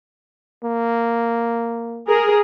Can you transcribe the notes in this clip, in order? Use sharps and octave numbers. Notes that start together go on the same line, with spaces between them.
A#3
G#4 A#4